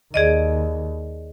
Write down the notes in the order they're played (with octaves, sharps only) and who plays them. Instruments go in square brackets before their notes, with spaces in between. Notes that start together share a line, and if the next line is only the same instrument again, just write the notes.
[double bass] D#2 [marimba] G#4 D5 D#5